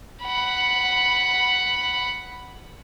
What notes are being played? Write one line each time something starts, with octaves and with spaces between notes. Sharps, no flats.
F#5 B5